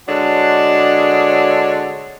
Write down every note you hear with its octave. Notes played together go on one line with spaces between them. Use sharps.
D3 G#3 D4 F#4 C#5